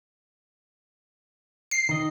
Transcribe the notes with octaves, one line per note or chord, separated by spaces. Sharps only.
C7
D#3 D#5